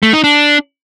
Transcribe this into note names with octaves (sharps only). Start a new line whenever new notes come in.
A3
D#4
D4